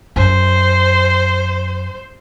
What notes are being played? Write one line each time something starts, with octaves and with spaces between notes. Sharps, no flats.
F#2 C5